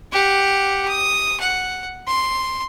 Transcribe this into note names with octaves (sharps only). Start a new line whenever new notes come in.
G4 F#5
D#6
F#5
C6